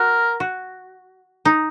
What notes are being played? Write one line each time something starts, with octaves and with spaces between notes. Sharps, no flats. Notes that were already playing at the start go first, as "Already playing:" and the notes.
Already playing: F#4 A#4
F#4
D#4